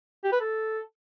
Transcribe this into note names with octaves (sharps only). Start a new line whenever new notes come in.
G4
B4
A4